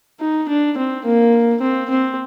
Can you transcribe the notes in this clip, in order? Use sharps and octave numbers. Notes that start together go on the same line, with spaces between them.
D#4
D4
C4
A#3
C4
C4